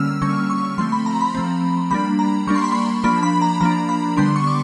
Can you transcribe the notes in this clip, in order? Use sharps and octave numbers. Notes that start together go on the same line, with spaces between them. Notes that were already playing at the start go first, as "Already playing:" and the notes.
Already playing: D3 G3 A#3 C#4 E6 F6
D3 G3 A#3 C#4 C#6
C#6
F3 A3 C4 C6
B5
A#5
B5
F3 A3 C4
G3 A#3 D4 B5
A#5
G3 A#3 D4 C#6
C6
B5
C6
F3 A#3 D4 B5
B5
A#5
F3 A#3 D4 A#5
B5
D3 G3 B3 D4 C6
C#6
D6